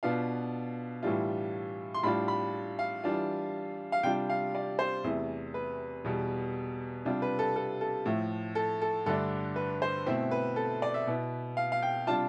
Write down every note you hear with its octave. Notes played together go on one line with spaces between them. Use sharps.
B2 B3 D4 F4 F5
A2 E3 G3 D4 F4
C6
A2 G3 D4 F4 B5
B5
F5
E3 G3 D4 F4
F5
C3 G3 D4 F4 G5
F5
D5
C5
E2 C3 E3 A3
B4
E2 B2 G3
C3 G3 D4 F4
B4
A4
A4
A4
A2 F3 A3
A4
A4
G2 D3 A3 D4 A4
B4
C5
B2 A3 C4 E4 E5
B4
A4
D5
E5
B2 B3 E4
F5
F5
G5
C3 G3 D4 F4 A5